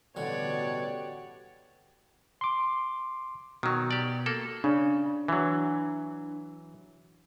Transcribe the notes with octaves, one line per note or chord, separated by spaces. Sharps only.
A1 B2 D3 G3 F#4 G4 C#5 D5
C6 D6
B2 D#3 F#3
G4 D5
A#3 A4
C#3 D4
E3 F#3